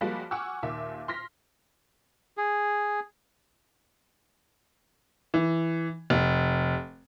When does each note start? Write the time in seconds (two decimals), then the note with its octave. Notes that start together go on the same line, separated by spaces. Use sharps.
0.01 F3 G3 G#3 A#3 F#4
0.31 F#5 G#5 C#6 D6 E6 F6
0.63 D#2 A#2 E5 D6
1.08 C6 F6 A#6 B6
2.37 G#4
5.34 E3
6.10 F1